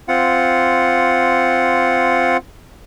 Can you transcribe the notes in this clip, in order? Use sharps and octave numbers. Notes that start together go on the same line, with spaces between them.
C4 F4 F#5